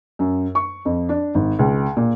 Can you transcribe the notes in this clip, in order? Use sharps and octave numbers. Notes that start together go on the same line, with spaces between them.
F#2
C#6
F2
D4
G#1
C#2
A#2